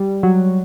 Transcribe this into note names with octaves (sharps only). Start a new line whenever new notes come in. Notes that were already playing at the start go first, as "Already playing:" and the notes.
Already playing: G3
F#3